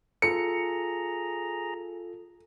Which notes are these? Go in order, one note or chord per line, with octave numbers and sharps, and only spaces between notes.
F4 G#4 A4 A#5 C#7